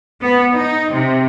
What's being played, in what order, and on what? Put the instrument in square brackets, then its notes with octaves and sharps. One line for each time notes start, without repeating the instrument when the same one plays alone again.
[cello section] B3
D#4
C3